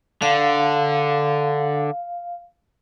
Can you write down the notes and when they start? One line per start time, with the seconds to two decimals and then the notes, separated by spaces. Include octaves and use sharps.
0.22 D3 F5